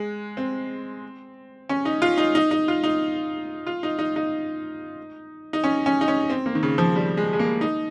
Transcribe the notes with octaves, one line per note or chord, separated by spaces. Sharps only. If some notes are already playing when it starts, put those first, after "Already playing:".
Already playing: G#3
C4
C#4
D#4
F4
D#4
D#4
D#4
F4
D#4
F4
D#4
D#4
D#4
D#4
C#4
C#4
D#4
C#4
C4
A#3
D#3
C#3
F3
G3
G#3
G#3
A#3
D#4